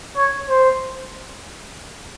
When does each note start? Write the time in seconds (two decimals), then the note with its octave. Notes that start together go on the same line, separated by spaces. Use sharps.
0.16 C#5
0.48 C5